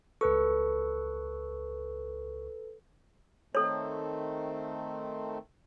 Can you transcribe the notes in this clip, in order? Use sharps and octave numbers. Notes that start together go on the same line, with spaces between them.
C#2 A4 B4 C#6
D#3 A3 C4 A4 C#5